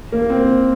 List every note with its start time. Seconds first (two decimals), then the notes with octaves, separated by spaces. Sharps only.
0.12 A#3
0.30 C4